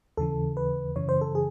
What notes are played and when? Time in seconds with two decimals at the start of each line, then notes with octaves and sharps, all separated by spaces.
0.17 D#2 C#3 E3 A4
0.57 B4
0.96 F#2 C#3 E3 C#5
1.09 C5
1.21 A4
1.35 G#4